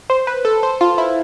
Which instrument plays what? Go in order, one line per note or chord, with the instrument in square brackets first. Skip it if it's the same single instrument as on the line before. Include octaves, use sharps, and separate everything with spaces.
[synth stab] C5
B4
A4
C5
F4
E4